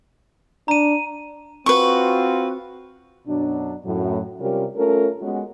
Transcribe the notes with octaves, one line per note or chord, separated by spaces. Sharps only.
D4 A#5 D#7
C4 F4 F#4 B4 C#6
F#2 B2 F#3 D4
F#2 A2 F#3
C3 G3 C#4 F4 G4 A#4
A3 C#4 F4 A4 A#4
G#3 B3 C#4 F#4